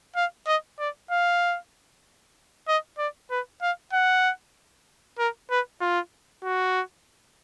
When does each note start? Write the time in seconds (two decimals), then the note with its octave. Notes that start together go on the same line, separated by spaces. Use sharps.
0.16 F5
0.47 D#5
0.79 D5
1.11 F5
2.68 D#5
2.98 D5
3.31 B4
3.62 F5
3.93 F#5
5.19 A#4
5.51 B4
5.81 F4
6.44 F#4